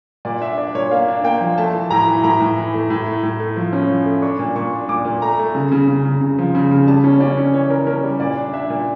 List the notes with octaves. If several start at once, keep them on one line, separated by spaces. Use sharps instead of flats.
A#2 D5
D4 E5
D4 D5
A#2 C#5
A#3 F5
D4
A#3 G5
F3
A3 A5
E3
A2 A#5
E3
A2 A#5
A2
E3
A3
A2
A3
A2
A3
F3
C#4
F3
A3
D4 C#6
A#2
A#2 C#6
D4
A#2 D6
A#2
A3 A#5
A3
C#3
C#3
C#3
C#3
C#3
F3
C#3
C#3
G3 A5
C#4
C#4 D5
C#4
E3 C#5
E3 A#4
C#4 A#4
G3
A#2 D5
D4
D4 E5
A#2